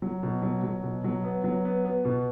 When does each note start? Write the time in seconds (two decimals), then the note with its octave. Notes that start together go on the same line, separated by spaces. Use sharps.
0.02 F#3
0.23 B2
0.42 F#3
0.63 F#3
0.83 B2
1.04 F#3
1.24 B3
1.44 F#3
1.65 B3
1.85 B3
2.05 B2